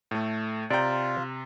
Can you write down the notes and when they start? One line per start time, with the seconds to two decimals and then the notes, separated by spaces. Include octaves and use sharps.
0.11 A2 A3
0.70 C3 F4 D5 G5 A#5